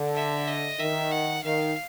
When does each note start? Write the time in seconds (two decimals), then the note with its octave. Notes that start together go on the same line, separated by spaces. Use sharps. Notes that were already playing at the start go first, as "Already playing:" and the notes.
Already playing: D3
0.16 E5
0.48 D#5
0.79 D#3 E5
1.11 F#5
1.44 D#3 F5